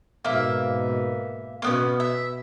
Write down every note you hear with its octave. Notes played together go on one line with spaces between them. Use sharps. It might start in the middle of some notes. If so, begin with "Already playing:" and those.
G#2 B2 A#3 E5
B2 A#3 B3 C#4
E5